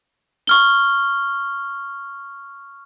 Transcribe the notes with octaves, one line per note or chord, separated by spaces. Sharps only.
C#6 F6 G7